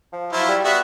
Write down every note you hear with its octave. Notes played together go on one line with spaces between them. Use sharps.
F3
F3 F#3 E4 F4
G3
G3 B3 F#4 E5